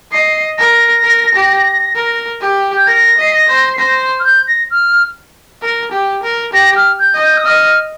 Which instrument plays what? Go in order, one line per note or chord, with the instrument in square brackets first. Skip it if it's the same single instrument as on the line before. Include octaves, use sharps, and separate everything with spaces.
[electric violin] D#5 [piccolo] C7
[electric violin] A#4 [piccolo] A#6
[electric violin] A#4
G4
A#4
G4
[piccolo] G6
[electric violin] A#4 [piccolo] A#6
[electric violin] D#5 [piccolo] C7
[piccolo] A#6
[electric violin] C5
[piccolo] C7
[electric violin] C5 [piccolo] A#6
[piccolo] F6
G6
A#6
F6
[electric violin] A#4
G4
A#4
[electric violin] G4 [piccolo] A#6
[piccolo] F6
G6
[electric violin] D#5
[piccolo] G6
D#6
[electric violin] D#5 [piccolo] F6